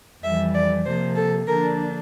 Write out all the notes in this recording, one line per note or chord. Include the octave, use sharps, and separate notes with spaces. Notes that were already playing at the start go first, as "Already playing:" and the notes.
F2 E3 G3 E5
D5
C3 F3 A#3 C5
A4
D3 F3 A#3 D4 A#4